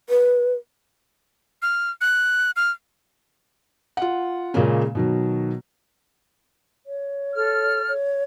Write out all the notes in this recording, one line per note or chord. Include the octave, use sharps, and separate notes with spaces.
B4
F6
F#6
F6
F4 F#5
A#2 C#3 G#3 A#3 C#4
B2 D#3 F#3
C#5
A4 F6
C#5